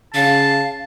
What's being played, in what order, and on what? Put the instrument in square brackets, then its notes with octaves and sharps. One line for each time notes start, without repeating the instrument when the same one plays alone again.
[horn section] C#3 [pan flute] F5 [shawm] A5